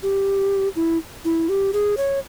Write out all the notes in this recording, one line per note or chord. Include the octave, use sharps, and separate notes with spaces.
G4
E4
E4
G4
G#4
C#5